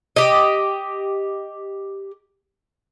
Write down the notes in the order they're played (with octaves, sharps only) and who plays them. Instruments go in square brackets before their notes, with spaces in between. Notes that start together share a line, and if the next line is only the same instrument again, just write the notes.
[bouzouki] G4 D#5